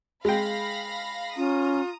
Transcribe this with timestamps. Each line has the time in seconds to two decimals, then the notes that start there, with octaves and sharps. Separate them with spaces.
0.25 G#3 F5 G5 B5 A#6
1.37 C#4 F4 A#5 D#6